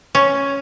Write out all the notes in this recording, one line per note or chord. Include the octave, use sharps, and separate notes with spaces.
C#4